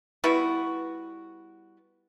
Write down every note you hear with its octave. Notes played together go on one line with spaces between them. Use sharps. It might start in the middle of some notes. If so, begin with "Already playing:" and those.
G3 B3 E4 F#4